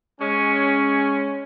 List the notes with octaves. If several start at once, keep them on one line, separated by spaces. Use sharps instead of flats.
G#3 C#4